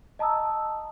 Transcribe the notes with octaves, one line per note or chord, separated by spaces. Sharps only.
D#5 A5 A#5 D#6 E6